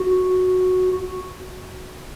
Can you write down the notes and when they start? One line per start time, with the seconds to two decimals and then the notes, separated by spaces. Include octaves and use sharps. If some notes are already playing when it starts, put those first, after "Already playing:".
Already playing: F#4